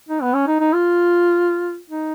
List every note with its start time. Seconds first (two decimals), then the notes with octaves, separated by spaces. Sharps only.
0.09 D#4
0.22 B3
0.34 C#4
0.47 D#4
0.60 D#4
0.73 F4
1.90 D#4